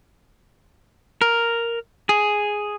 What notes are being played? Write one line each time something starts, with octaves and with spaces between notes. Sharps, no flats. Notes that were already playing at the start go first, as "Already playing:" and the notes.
A#4
G#4